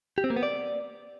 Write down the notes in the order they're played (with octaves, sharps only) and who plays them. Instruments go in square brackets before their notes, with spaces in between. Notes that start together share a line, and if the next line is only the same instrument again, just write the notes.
[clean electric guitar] G4
C4
A#3
B3
D5